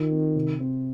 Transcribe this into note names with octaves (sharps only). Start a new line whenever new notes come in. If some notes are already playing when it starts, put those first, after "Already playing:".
Already playing: D#3 F4
C4
C3
C4